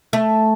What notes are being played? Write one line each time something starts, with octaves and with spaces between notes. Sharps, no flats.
A3